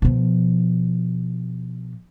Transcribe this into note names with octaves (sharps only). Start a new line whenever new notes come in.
B2 F3